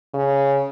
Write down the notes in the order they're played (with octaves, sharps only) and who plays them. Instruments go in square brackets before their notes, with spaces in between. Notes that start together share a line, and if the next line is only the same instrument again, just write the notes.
[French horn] C#3